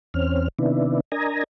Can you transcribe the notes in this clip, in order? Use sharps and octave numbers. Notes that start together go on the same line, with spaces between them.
E2 C4 C#4 F6
C3 D#3 B3 D4 E4
D4 A#4 D#5 G#5 A#5